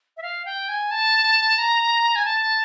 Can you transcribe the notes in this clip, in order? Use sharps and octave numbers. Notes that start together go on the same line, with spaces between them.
E5
F5
G5
G#5
A5
A#5
G#5
A5